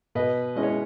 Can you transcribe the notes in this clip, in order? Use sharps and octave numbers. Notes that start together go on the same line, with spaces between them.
B2 B4 D#5
G#3 C#4 E4 D#5
C#5